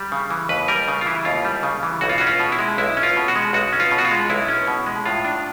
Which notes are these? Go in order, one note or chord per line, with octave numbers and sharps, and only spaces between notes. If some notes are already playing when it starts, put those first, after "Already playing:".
Already playing: G3
C#3
E3
D#2 B4
G3 A#4
C#3
F4
E3 E4
D#2 F4
G3
C#3
E3
B1 F#4
F4
C#4 F#4
F4
B2
E4
G#3
B1 E4
C#4
F4
B2
F#4
G#3
B1 F#4
C#4
F4
B2
F#4
F4
G#3
B1 E4
C#4
B2
G#3
A2 F4
D4